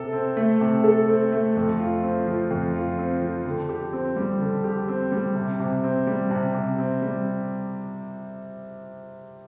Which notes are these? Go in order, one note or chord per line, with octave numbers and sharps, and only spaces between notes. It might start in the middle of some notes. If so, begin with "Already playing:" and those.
Already playing: C3 A4
C4
A3
C3
A4
C4
A3
F2
F4
C4
F3
F2
F4
C4
F3
D3
G4
C4
G3
D3
G4
C4
G3
C3
C3
C4
G3
C3
C3
C4
G3